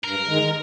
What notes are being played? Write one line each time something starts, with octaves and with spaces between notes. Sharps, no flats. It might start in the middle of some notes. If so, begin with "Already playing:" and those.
G2 A#4
D#3 G#3